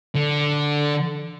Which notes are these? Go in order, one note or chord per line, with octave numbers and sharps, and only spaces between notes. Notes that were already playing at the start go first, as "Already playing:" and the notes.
D3